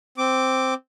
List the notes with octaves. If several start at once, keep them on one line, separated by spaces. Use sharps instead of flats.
C4 D6